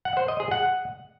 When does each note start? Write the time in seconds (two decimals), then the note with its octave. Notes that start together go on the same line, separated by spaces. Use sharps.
0.05 F#5
0.17 C5
0.28 D#5
0.40 G#4
0.51 F#5